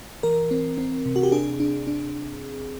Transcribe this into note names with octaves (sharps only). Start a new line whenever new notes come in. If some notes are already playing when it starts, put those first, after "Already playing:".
E3 A#4
C4
C4
C3
F#4
G4
D4 G#4
D4
D4